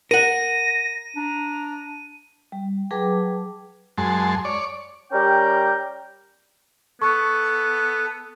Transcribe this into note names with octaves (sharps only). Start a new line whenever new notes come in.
A#4 F#5 A#6 D#7
D4 A#5
G3
F#3 G#4 B4 G5 A5 D6
F#2 G#3 A5 C6
C#5 D5
G3 C#4 A#4 D5 G5
B3 A4 C#6